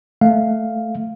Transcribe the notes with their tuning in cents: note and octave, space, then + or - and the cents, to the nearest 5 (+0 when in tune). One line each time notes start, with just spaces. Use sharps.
A3 +0 F5 +0